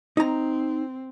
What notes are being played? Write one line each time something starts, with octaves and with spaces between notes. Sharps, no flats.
C4 D#4 A#5